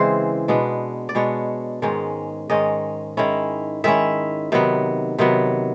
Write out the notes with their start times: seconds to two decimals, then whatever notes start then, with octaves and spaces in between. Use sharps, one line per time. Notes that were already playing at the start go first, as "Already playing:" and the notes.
Already playing: C#3 E3 G#3 C4 G#4 C5
0.48 B2 G#3 B3 D4
1.09 D5
1.15 B2 G#3 B3 D4 C#5
1.82 G#2 D#3 G#3 C#4
2.50 G#2 D#3 G#3 C#4 D#5
3.17 D#3 G#3 C#4 E4
3.84 D#3 G#3 C#4 E4 E5
4.52 C3 D#3 F#3 B3
5.18 C3 D#3 F#3 B3